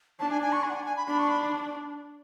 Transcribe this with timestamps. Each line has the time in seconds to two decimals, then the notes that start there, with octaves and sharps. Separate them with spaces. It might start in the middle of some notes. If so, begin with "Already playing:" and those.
0.19 D4 A5
0.30 G#5
0.42 G#5
0.52 C#6
0.63 G#5
0.70 F#5
0.74 G#5
0.86 G#5
0.97 B5
1.07 D4 B5
1.19 C#6
1.29 B5